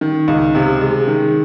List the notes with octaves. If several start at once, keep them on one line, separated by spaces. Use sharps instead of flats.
D#3
C#2
C3
G#3
D#3